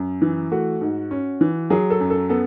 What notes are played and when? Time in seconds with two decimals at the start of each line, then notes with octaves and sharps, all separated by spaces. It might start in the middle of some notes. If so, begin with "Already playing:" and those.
Already playing: F#2
0.22 E3
0.51 A3 F#4
0.81 G#2
1.11 C#4
1.41 E3
1.70 F#3 G#4
1.90 A4
2.00 F#2
2.10 A4
2.29 B3 A4